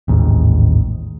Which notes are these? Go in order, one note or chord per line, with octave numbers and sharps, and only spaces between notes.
A1 D#2 G#2